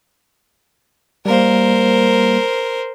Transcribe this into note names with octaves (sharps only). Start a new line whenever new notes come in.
G3 A#3 A#4 C5